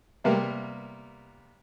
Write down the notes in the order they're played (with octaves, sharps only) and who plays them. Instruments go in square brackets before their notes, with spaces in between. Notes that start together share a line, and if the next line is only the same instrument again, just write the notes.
[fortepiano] C3 G3 A#3 B3 A#4